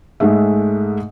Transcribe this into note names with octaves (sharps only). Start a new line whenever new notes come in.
G#2 G#3 A3 E5